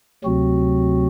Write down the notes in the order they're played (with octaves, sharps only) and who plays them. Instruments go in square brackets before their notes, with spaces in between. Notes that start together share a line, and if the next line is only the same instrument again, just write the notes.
[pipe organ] D2 C3 F#3 C4 F#4